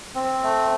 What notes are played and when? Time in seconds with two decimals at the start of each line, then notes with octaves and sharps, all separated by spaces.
0.15 C4
0.43 A3